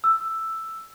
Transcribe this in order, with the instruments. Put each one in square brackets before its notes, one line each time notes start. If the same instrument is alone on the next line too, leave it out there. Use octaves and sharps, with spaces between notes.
[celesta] E6